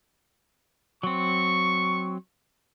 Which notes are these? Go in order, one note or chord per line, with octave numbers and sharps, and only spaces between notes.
F#3 C4 C#6